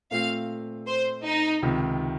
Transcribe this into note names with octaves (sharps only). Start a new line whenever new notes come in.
A#2 A3 C4 F5
C5
D#4
C#2 C3 D#3